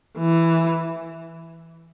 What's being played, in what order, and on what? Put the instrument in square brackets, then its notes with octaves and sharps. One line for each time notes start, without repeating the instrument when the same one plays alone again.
[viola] E3